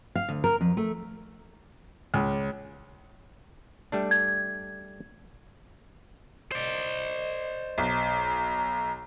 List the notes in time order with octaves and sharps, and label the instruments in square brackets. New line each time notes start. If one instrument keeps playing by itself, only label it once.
[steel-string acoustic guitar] F5
D2
A#4
F2
A3
[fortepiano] C#2
[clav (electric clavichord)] G3 A3 D4
[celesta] G#6
[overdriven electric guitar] C5 D5 [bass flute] D#5
[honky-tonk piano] B1 [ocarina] A#5